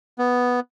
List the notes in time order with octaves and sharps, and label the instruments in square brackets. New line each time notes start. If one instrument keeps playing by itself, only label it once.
[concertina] B3